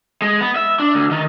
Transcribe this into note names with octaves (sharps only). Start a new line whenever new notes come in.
G#3
B3
E5
D4
D2
D#3